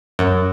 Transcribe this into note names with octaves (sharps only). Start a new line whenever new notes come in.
F#2